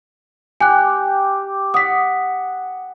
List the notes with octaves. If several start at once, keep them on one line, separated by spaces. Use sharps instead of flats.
G4 G#5 F#6
F#5 D#6 B6